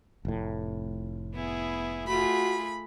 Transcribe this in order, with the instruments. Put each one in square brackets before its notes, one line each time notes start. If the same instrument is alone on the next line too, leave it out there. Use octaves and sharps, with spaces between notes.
[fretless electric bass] F1 A2
[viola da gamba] B3 E4 G#4
[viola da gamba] A3 F4 G#4 [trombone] F#4 [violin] B5